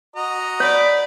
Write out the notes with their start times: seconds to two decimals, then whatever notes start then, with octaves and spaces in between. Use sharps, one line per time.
0.16 F#4 D#5 A#5
0.60 C#5 D5 B5